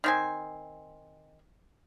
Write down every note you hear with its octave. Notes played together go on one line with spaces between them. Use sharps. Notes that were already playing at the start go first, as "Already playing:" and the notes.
D#3 C4 G#5